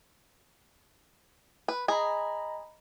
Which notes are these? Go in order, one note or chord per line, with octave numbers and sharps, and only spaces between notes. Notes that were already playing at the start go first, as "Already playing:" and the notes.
B4
G#4 D#5 A#5 B5